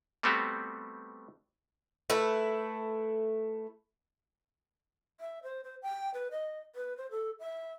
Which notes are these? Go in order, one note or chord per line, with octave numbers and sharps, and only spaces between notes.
G3 A3 B3 C4 F#4 G4
A3 E4 B4
E5
C5
C5
G5
B4
D#5
B4
C5
A4
E5